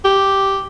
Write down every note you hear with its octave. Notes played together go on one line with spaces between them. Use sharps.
G4